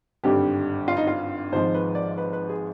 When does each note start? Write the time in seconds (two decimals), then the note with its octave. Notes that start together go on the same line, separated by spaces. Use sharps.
0.24 G#1 G2 D3 G3 G4
0.88 F4
0.97 D#4
1.07 F4
1.52 G#1 G#2 F3 G#3 C5
1.74 B4
1.95 D5
2.18 B4
2.33 B4
2.49 G#4